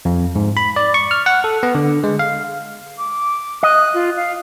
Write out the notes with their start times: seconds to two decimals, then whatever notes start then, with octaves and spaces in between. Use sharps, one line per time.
0.05 F2
0.36 G#2
0.57 B5
0.76 D5
0.94 C#6
1.11 F6
1.26 F#5
1.44 A4
1.63 B3
1.75 D3
2.04 G#3
2.19 F5
2.98 D6
3.63 D#5 F#6
3.94 F4
4.17 F5